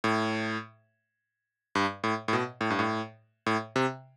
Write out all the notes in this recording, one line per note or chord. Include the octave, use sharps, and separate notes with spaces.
A2
G2
A2
A2
B2
A2
G2
A2
A2
C3